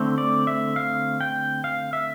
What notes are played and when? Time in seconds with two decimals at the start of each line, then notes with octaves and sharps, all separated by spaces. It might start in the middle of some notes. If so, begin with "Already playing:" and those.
Already playing: D3 A3 C4
0.18 D5
0.47 E5
0.76 F5
1.21 G5
1.64 F5
1.93 E5